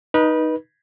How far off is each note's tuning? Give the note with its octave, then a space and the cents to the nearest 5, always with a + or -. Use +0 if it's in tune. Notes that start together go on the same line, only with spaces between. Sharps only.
D#4 +0 B4 -25